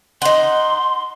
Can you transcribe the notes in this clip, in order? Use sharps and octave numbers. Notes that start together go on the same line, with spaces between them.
D#4 F#5 C6